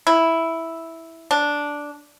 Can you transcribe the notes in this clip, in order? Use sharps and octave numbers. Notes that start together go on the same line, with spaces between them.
E4
D4